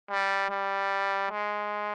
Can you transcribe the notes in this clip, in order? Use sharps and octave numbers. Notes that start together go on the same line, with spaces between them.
G3
G3
G#3